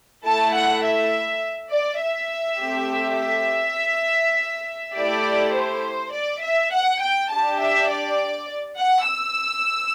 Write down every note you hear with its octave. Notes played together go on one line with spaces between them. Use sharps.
A3 E4 A4 A5
F#5
E5
D5
E5
A3 C4 G4
E5
A3 E4 G4 D5
C5
D5
E5
F#5
G5
D4 G4 A5
E5
D5
F#5
E6